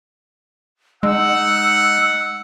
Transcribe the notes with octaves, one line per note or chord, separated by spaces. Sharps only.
G#3 D#4 F#5 E6